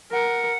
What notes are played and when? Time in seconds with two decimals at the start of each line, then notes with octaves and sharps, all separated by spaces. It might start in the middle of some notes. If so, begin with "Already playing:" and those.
0.12 A#4 F#5